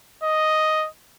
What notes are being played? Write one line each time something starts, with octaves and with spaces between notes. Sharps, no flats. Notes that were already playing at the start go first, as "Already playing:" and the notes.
D#5